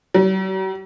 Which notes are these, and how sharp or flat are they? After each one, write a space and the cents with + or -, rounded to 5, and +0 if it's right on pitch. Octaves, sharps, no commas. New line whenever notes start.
F#3 +45